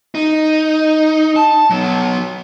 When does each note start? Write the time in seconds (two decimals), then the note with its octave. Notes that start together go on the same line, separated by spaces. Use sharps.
0.15 D#4
1.36 A5
1.70 F#3 B3